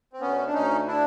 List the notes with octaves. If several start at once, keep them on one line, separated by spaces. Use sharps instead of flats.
C4
D2 B3 C#4
D4
D2 C#4 D#4
D4 E4